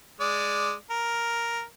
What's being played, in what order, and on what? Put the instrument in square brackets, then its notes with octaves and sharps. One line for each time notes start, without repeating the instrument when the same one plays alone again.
[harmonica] G#3 D5
A#4